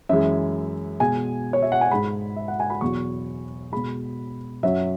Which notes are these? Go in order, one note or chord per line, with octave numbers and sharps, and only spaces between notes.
F#2 E3 G#3 E5
B2 G#3 G#5
C#5
E5
F#5
G#5
G#2 G#3 B5
E5
F#5
G#5
B5
E2 B2 F#3 C#6
B2 G#3 B5
F#2 F#3 E5